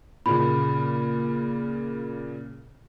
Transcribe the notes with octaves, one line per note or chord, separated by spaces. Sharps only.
A#2 C#3 B5